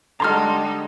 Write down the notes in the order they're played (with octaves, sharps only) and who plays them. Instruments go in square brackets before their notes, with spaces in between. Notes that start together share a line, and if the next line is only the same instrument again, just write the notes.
[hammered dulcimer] D3 G#3 [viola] G3 D#4 [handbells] A#5 C6 F6